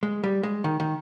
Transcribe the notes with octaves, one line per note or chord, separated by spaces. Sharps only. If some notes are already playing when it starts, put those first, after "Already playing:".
G#3
G3
G#3
D#3
D#3